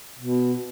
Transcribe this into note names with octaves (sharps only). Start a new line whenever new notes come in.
B2